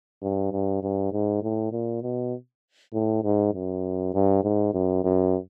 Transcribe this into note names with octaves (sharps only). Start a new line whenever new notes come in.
G2
G2
G2
G#2
A2
A#2
B2
A2
G#2
F#2
G2
G#2
F#2
F#2